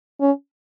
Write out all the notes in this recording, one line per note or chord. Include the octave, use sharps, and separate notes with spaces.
C#4